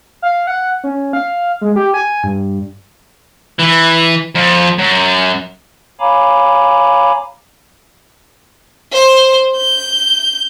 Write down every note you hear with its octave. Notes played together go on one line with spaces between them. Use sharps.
F5
F#5
C#4
F5
G#3
G4
G#5
G2
E3
F2
F#2
C#5 F5 G#5 A#5 B5 D6
C5
G6